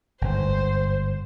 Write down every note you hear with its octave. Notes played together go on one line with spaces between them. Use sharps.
G1 G#2 C5